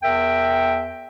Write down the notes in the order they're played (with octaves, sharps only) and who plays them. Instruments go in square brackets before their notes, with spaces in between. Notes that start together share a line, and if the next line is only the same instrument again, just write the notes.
[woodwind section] E2 A#4 E5 G5